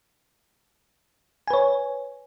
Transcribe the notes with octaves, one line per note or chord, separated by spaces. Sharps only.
B4 C#5 G#5